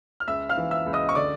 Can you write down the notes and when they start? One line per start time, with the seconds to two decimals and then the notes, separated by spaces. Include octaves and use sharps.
0.20 F6
0.28 C#2 E5 E6
0.49 F5 F6
0.57 E3
0.71 E5 E6
0.86 C#2
0.93 D#5 D#6
1.09 C#6
1.15 D3 D5 D6